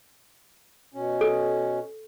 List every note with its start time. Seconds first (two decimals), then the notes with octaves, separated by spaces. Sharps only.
0.94 B2 C#4
1.21 A4